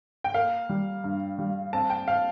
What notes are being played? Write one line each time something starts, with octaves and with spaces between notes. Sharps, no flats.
G5
A#3 F5
G3
G2
G3
C4 A5
G5
F5